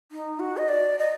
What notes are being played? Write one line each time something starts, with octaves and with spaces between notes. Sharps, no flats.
D#4
F#4
D#5
D5
D#5